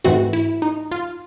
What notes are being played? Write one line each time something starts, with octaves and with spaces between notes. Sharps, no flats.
G#2 E3 A3 C4 F#4
E4
D#4
F4